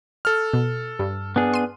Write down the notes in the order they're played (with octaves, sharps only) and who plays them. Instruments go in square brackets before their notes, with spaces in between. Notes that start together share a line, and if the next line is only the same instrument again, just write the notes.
[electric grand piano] A4 F6
[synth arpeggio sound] B2
G2
[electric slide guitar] B3 D4 G#4
[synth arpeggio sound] C6 D#7